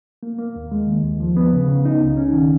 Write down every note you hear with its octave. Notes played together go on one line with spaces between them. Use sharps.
A#3
A#3
D#2
G#3
D#3
D#2
F3
B3
C#3
C#3
D#4
C#2
C#4
D#3